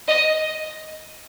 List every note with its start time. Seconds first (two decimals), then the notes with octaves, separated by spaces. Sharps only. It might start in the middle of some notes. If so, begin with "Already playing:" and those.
0.08 D#5